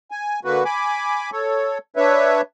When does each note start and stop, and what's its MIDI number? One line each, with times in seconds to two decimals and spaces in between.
0.11 0.39 80
0.45 0.64 50
0.45 0.64 58
0.45 0.64 66
0.45 0.64 71
0.65 1.30 80
0.65 1.30 83
0.65 1.30 86
1.32 1.78 69
1.32 1.78 73
1.96 2.41 62
1.96 2.41 71
1.96 2.41 73
1.96 2.41 76